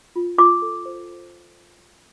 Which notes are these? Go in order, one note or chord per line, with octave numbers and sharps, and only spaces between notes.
F4
F4 D6
A4
C5